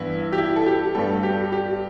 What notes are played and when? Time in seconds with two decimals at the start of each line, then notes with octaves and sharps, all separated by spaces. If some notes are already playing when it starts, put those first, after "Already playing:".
Already playing: G2 E3 B3 E4
0.33 G4
0.38 E4
0.56 A4
0.66 G4
0.95 G2 G3 B3 A4
1.23 G4
1.52 G4